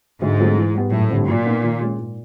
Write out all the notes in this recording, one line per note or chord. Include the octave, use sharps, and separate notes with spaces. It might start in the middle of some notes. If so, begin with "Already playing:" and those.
D2 G#2
D3 F#3 A3 C4
E3
G3 B3
F#2 A2
D3 G3 C4
A#2 F#3
B3 D#4
D#3
G#3 C#4
G#2